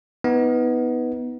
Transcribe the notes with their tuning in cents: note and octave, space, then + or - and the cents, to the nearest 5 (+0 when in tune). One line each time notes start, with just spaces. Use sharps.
B3 +0 D#4 +30